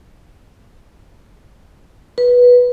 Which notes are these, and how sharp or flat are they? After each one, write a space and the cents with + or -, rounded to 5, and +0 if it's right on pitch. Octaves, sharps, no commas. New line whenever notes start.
B4 -10